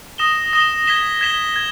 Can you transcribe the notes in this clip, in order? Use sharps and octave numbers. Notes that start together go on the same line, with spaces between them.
D#6 A#6 E7 G7
D#6 A#6 E7 G7
G#6 B6 E7 G7
G#6 B6 E7 G7
G#6